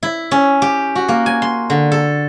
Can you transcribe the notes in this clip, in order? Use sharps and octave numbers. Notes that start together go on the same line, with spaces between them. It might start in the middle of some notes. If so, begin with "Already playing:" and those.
E4
C#4
G4
F#4
A#3
G#5
C6
D3
A4